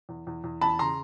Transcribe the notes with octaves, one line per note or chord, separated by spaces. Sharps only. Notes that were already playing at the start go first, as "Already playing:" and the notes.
E2
E2
E2
E2 A5 B5
C#3 A#5 C6